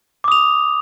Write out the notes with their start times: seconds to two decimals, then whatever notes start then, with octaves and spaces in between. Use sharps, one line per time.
0.24 D6
0.28 D#6
0.32 F7